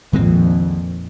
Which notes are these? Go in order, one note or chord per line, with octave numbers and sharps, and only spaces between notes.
A#1 F2 D#3 G#3 C4